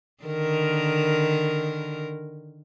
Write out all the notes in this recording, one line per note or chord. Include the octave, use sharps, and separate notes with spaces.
D3 D#3 A#4